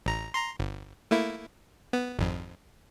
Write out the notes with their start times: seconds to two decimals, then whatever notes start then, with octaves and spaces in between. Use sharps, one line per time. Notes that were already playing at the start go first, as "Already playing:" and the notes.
0.06 A1 A#5
0.34 A#5 C6
0.59 G1
1.11 A3 A#3 E4
1.93 B3
2.19 G#1 F2